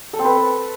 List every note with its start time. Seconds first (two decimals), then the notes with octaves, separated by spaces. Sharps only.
0.13 A4
0.19 C4
0.25 B4